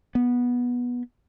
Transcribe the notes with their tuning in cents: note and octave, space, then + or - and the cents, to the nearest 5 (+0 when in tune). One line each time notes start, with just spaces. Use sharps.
B3 -15